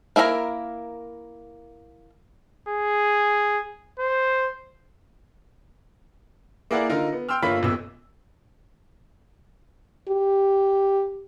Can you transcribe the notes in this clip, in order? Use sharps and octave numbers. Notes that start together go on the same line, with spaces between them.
A#3 E4 A#4 D#5 A#5
G#4
C5
A#3 E4 G#4 A#4 D5 F#5
D3 D#4 F4 A#4
B3
G5 C6 E6 F6
G1 A#3 F4 C#5 B5 B6
D#1 A1 B2 E6
G4